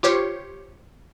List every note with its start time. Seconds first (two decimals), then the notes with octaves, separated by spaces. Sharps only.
0.03 F4 G4 C5 C#5